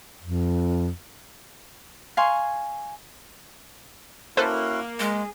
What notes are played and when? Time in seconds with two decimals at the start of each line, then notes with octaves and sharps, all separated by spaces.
0.22 F2
2.17 F5 G#5 C6 C#6
4.37 A#3 C#4 E4 F#4 A4 B4 C5
4.99 G#3 G#4